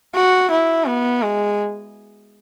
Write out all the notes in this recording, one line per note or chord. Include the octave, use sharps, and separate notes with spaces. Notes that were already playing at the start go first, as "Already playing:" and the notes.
F#4
E4
B3
G#3